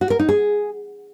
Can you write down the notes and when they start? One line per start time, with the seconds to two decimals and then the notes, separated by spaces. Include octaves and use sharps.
0.01 F#4
0.10 A#4
0.19 D#4
0.29 G#4